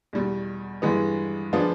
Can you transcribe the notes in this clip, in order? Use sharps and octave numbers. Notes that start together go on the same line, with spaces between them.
E2 B2 G3
G2 E3 G#3 B3
F3 G#3 B3 D4 F4